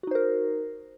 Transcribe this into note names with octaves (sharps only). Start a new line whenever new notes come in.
D#4 F#4 A#4 C5